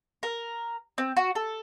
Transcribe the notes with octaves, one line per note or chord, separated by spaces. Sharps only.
A#4
C4
F#4
A4